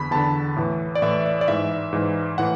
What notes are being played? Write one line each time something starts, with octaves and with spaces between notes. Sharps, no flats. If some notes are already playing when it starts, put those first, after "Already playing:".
Already playing: E2 D3 B5
E2 D3 A5
A2 E3
D5
A2 E3 E5
D5
D5
G#2 E3 E5
G#2 E3
A2 E3 F#5